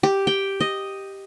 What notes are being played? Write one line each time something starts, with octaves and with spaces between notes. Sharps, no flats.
G4
G5
D#5